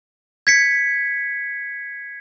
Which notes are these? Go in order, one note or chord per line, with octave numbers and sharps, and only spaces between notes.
G#6 B6 C#7